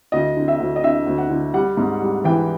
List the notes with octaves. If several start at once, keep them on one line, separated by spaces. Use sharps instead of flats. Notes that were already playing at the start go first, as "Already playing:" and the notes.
D2 D#5
D3
E5
D2
D#5
D3 E5
D2
F#5
D3
G3 F#5
G#2
G3
E3 G5